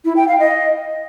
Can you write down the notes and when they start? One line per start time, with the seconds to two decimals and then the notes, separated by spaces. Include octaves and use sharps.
0.05 E4
0.17 G5
0.28 F5
0.40 D#5